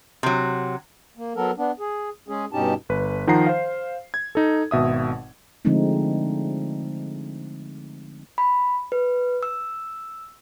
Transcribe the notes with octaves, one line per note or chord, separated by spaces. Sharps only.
C3 F#3
A#3
F#3 B3 A4 A#4
B3 D4
G#4
G#3 C#4 G#4
G2 B2 C#4 D#4 G4 A5
G1 B4
D#3 F3 D#4 F#5 A#5 C7
C5 F5
G#6
D#4 A4
G#1 B2 E5 D#6
D3 F3 G#3 A3 C4 D#4
B5
B4
E6